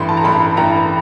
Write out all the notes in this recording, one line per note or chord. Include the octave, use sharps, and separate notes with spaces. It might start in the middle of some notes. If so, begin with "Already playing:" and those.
Already playing: A1 G2 E3 C6
A5
A#5
A1 G2 E3 B5
A1 G2 E3 A#5